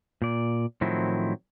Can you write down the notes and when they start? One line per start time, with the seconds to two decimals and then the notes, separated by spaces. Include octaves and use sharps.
0.22 A#2 D5
0.81 A2 D#3 F3 F#3 C4 E4